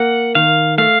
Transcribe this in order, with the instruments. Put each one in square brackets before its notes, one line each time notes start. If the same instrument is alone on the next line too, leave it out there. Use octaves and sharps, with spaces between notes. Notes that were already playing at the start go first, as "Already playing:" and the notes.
Already playing: [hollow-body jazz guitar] A#3 [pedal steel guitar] F#5
[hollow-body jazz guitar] D#3 [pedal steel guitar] F5
[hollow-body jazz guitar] A3 [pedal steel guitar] F5